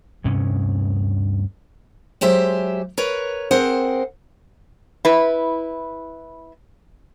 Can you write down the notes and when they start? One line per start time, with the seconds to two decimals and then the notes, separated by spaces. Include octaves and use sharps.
0.24 D2 G2 C3 C#4
2.21 F#3 G#3 G4 C5 E5
2.98 A#4 B4 C#5
3.51 C4 G#4 A#4 C5 F#5
5.05 E4 B4